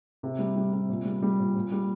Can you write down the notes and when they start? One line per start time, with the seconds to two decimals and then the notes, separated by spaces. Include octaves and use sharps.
0.23 C3
0.39 G3
0.56 G3
0.72 C3
0.89 A#2
1.05 G3
1.22 G3
1.39 A#2
1.56 A#2
1.72 G3